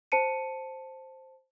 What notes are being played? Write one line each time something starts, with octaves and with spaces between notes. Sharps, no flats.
C5 A5 C#7 D#7